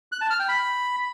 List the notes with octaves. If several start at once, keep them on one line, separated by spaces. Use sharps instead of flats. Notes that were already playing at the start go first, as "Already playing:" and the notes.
F#6
A5
F6
G5
B5